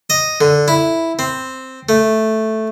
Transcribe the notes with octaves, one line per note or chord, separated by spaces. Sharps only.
D#5
D3
E4
C4
A3